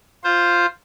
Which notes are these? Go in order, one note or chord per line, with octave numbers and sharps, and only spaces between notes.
F4 C5